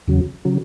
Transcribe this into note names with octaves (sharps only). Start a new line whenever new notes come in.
E2 C#3 F#3
C#3 F#3